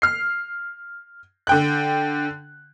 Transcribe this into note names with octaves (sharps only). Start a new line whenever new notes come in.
F6 C7
D3 G5 F#6